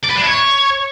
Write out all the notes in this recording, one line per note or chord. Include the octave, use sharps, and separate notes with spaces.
D5
B4
D4
E4
C#5